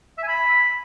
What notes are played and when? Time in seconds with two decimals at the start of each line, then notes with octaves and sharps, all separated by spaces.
0.18 E5
0.23 G#5
0.28 B5